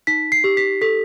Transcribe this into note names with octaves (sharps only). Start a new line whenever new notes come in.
D#4 B6
C7
G4
B6
A4 B6